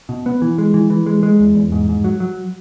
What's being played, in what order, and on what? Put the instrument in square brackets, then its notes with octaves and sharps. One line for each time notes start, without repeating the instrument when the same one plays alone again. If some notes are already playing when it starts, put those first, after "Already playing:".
[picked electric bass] B2
B3
E3
G#3
E3
E3
G#3
G#3
E2
E2
G#2
G#2
F#3
F#3